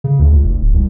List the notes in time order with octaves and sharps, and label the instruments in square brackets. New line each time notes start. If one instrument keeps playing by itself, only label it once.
[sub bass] C#3
D2
C#2
F1
D1
C2